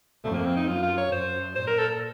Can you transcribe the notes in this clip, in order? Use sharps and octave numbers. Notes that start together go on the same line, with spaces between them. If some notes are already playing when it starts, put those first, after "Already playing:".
F2 A3
A#3
C4
D#4
F#2 F4
F4
C#5
F#2 C5
A#2 C5
A#4
A4